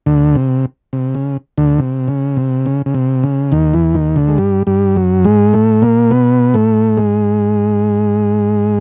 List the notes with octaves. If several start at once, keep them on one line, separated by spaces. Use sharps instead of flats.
D2 D3
C3
C3
C#3
D2 D3
C3
C#3
C3
C#3
C#3
C3
C#3
D#2 D#3
E2 E3
D#2 D#3
D2 D3
G#3
G2 G3
G2 G3
F#2 F#3
G#2 G#3
A2 A3
A#2 A#3
B2 B3
A2 A3
G#2 G#3